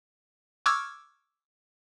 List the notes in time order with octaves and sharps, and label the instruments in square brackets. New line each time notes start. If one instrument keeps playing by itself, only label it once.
[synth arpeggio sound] C#6 D6 E6 F6 G#6